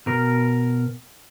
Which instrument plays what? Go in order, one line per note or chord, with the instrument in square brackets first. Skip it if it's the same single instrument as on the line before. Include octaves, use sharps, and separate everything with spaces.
[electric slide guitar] B2 A#4